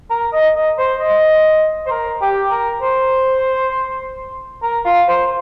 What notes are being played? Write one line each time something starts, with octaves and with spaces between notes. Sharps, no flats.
A#4
D#5
D#5
C5
D#5
C5
A#4
G4
A#4
C5
A#4
F4
C5